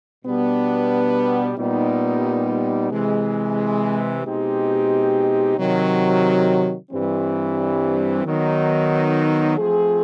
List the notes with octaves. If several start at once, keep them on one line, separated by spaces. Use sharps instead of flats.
B2 G3 B3 D4
A#2 G3 B3 D#4
C3 E3 G#3
B2 G#3 C4 D#4 G4
C3 D#3 F#3
G2 E3 G3 C4
D#3 F#3 B3 D#4
F3 A3 C4 F4 G#4